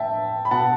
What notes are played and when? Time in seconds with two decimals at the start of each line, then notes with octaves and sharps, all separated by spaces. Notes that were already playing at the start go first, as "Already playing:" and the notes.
Already playing: A2 E5 G5 A5
0.45 B5
0.51 B2 F#5 A5